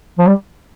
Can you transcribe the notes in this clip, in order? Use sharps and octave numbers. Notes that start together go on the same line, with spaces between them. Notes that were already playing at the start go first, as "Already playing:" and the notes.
F3
G3